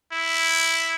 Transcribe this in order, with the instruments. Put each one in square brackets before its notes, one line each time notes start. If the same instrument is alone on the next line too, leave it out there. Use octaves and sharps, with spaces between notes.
[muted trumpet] E4